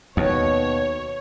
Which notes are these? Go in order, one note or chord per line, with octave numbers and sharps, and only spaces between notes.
D#2 B2 C#5